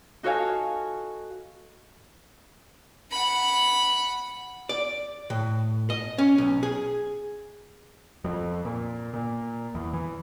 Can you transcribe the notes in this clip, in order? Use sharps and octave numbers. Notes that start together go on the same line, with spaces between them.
D#4 F#4 A4 C#5 F5 G#5
F#5 B5
D5
A2
D#5
C#4
B1
G#4
F2
A#2
A#2
E2
E3